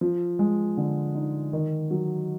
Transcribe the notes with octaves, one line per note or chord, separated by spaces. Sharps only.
F3
G#3
D3
D#4
D#3
F#3